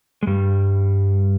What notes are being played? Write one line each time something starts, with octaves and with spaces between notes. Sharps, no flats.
G#3
G2 G3